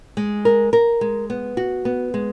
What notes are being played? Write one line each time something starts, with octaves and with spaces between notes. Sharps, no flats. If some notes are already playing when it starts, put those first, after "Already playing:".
G#3
A#4
A#4
G#3
B3
F#4
B3
G#3